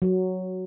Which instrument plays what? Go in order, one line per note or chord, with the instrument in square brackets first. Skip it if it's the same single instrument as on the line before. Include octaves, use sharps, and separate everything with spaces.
[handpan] F#3